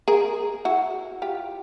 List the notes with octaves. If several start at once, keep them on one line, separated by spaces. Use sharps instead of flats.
G#4 A#4
E4 F#4
F4 G4